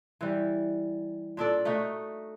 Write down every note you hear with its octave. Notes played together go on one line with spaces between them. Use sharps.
E3 G3
A#2 D4 A4 D5
A3 D#4 F#4